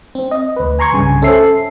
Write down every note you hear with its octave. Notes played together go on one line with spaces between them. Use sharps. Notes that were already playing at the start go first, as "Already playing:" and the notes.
C4
D#5
D2 B4
G#5 A#5 C6 C#6 G#6
C2 G2 C#3 G#5
C#4 A4 C5 E5 C7